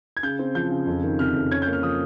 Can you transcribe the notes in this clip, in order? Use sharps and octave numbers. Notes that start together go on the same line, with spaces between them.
G#6
C#3 G6
C4
F3 G6
C#3
F2
D#3
C3 F6
F2
C#4 G#6
G6
A#3
F6
F3 D#6